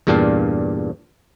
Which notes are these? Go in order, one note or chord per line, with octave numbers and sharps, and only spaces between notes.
E2 G2 A#2 D4 G4 F5